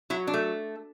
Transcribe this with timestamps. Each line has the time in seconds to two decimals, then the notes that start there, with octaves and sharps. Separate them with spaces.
0.10 F#3 E4
0.27 D4
0.34 A3